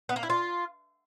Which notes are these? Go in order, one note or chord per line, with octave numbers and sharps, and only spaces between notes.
B3
A#3
E4
F4